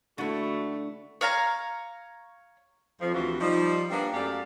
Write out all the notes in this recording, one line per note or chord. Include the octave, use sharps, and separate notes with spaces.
D3 A3 E4 F#4 C#6
C#5 F5 A5 A#5
F2 F3
D2 C3 E3 F3 F4 F#4
F3 G3 D#4
G3 A#3 B3 D4
F#2 A3 G4 D5 F5